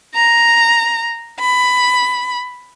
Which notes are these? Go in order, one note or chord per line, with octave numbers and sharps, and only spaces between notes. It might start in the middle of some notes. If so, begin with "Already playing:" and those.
A#5
B5